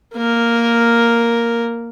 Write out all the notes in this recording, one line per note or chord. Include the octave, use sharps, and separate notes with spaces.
A#3 A#4